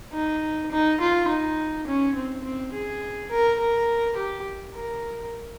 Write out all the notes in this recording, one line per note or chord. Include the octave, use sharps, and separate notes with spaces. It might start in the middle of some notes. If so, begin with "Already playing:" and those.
D#4
D#4
F4
D#4
C#4
C4
C4
G#4
A#4
A#4
G4
A#4